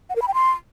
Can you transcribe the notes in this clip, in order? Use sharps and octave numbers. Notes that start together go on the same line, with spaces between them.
F#5
A#4
B5
G5
C6